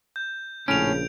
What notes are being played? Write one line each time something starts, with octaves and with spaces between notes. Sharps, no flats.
G6
A#1 A2 C#3 C#4 D7 F7